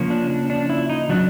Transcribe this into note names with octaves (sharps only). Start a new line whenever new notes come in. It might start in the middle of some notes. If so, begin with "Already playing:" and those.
Already playing: C#3 F3 A#3 C#4
D4
D4
D4
E4
D#4
C#3 F#3 D4